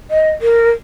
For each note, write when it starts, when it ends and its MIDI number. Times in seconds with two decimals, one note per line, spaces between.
0.10 0.30 75
0.41 0.70 70